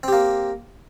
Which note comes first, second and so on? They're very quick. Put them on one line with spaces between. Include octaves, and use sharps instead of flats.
C4 G4 A#3